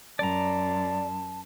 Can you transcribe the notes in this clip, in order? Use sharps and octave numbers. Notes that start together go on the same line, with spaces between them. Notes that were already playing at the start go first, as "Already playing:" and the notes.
F#2 D5 A5 A#5